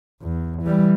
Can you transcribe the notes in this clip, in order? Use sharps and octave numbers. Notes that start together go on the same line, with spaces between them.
E2
E3 G3